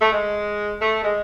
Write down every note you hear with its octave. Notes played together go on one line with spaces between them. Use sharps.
A3
G#3
A3
G#3